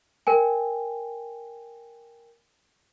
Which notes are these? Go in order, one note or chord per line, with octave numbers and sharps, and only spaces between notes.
A#4 G5 G#5